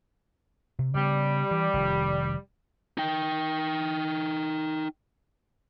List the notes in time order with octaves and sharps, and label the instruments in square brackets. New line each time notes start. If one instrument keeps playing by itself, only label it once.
[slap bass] C3
[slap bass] C#3 B3 [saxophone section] G3
[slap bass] E3
F1 F2 D#3
[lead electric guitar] D#4 G5